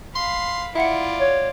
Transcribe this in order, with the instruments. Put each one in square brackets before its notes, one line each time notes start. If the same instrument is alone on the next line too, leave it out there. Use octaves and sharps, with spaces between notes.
[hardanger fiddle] F5 B5 [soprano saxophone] C6
[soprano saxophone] E4 [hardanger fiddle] F4 D5 [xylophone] E5 F#5 C#7
[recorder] C#5